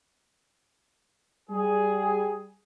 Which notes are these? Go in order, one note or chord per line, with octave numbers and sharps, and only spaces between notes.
G3 G#4